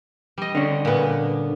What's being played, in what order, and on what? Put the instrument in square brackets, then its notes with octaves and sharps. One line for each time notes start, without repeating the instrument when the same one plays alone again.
[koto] G3 D#5
[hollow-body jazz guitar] D3 C#4
[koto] A#2 B3